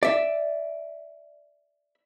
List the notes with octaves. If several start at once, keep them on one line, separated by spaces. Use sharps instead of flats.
D5 E5